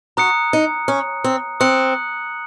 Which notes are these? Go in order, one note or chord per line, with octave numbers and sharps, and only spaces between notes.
F#4 A#5 D#6 F#6 C#7
D#4
C#4
C4
C4 D#6 F#6 C#7 F#7